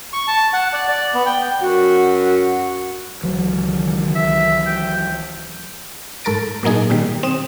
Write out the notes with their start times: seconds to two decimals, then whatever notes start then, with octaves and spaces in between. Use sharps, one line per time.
0.13 C#6
0.28 A5
0.53 F#5
0.73 D5
0.88 D5
1.14 B3
1.26 G5
1.61 F#2 F#4
3.23 C#2 D#3 E3 F#3
4.15 E5
4.66 G5
6.24 G#2 A4 A#4 A6 D7
6.63 A#2 F#3 A#3 D#4 G#4
6.90 B2 D#3 G3
7.23 C4 D#6 E7